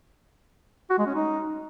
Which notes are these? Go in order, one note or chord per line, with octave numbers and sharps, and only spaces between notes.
F#4
G#3
C#4
D#4